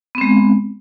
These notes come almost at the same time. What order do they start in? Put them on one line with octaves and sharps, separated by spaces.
B3 C4 G#3